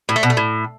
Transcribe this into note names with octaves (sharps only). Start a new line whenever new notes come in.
A2
A3
B2
A3
A2